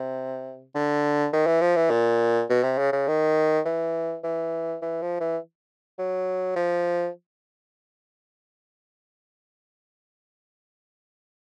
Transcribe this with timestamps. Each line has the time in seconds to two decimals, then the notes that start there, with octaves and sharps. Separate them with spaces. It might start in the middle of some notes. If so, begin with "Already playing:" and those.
Already playing: C3
0.75 D3
1.33 D#3
1.47 E3
1.61 F3
1.76 E3
1.91 A#2
2.50 B2
2.64 C3
2.78 C#3
2.93 C#3
3.08 D#3
3.65 E3
4.24 E3
4.82 E3
5.02 F3
5.20 E3
5.99 F#3
6.56 F3